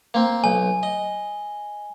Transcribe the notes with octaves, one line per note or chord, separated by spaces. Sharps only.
A#3 C4
B1 G#5
D#5